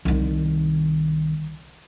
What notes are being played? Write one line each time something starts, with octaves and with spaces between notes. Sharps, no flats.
C2 D#3